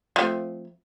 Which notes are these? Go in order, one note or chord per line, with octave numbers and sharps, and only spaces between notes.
F3 A3 C4